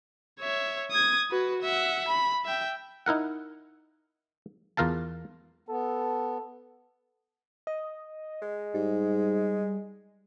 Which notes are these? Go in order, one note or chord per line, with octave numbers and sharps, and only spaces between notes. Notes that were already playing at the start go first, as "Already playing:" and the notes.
C#5 E5
D#6 G#6
F#4 B4
E5 F#5
B5
E5 G5
D#4 E4 A#4 F#5
E2 F4 A#4 F5 A5
B3 A4
D#5
G#3
G#2 G3